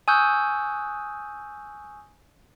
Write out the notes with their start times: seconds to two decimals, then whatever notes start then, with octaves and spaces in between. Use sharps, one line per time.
0.08 G#5 C#6 D#6 E6 F#6 G6